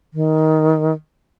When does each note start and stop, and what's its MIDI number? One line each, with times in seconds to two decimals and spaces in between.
0.14 0.93 51